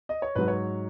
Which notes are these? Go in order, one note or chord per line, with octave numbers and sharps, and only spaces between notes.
D#5
C#5
G#2 F#3 B4
C#5